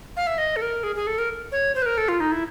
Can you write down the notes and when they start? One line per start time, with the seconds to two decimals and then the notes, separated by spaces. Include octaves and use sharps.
0.17 F5
0.27 E5
0.38 D#5
0.56 A4
0.62 A#4
0.83 G#4
0.96 G#4
1.07 A4
1.18 A#4
1.52 C#5
1.75 C5
1.82 B4
1.86 A#4
1.98 A4
2.08 F4
2.20 D#4
2.32 E4